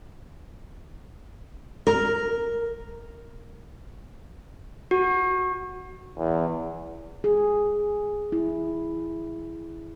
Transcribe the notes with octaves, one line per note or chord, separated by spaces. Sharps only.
A#4
F#4
E2
G#4
E4